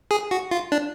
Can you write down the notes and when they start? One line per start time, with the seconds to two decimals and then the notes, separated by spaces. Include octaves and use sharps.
0.11 G#4
0.31 F#4
0.51 F4
0.72 D4